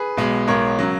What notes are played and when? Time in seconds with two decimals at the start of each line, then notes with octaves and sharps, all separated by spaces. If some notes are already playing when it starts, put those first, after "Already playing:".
Already playing: G#4 B4
0.17 B1 B2 G#3
0.48 B1 B2 G#3 A#4 C#5
0.79 C#3 F#3